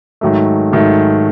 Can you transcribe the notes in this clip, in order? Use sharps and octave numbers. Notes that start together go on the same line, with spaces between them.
G#2 D#3 F#3 A3
G#2 D#3 F#3 A3